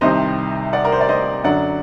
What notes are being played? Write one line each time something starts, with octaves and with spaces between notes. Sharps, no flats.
C2 C3 D#3 G3 C5 D#5
D5 F#5
A#4
C5
D5
C5 D#5
F#2 D3 F#3 D5 F#5